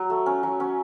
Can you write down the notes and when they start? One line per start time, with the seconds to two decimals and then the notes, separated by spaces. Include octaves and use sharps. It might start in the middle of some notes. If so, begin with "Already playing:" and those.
Already playing: F#3
0.10 A3
0.26 C#4
0.43 F#3
0.60 C#4